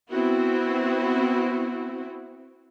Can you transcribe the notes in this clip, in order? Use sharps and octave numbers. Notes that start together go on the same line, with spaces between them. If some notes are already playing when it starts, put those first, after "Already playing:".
B3 C4 E4 F#4